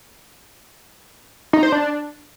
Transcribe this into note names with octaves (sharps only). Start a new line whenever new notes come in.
D#4
C5
D4